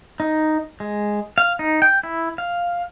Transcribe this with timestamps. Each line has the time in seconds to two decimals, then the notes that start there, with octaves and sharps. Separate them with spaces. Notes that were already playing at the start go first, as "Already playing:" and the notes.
0.20 D#4
0.80 G#3
1.38 F5
1.59 D#4
1.82 G5
2.03 E4
2.38 F5